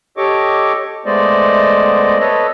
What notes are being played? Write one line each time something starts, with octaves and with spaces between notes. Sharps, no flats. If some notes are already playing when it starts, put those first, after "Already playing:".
G4 A4 C#5 D#5 C#6 D6
G#3 A3 B3 C5 D5 D#5
A4 B4 C#5 D#5